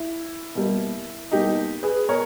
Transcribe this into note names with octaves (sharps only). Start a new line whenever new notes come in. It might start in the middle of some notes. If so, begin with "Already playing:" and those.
Already playing: E4
B2 G3 A#3
B2 G3 A#3 D#4 G4
G#4 B4
B2 A#4 C#5